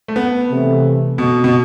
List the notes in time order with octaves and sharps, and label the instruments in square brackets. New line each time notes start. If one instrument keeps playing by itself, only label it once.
[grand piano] A3
B3
[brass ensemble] C3 E3 A3
[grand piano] B2
B2